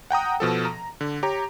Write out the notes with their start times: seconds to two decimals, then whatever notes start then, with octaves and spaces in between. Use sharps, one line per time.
0.10 F#5 G5 A#5 D#6
0.40 B2 F3 A4
0.65 A#5
1.01 D3
1.23 G4 C#5 A#5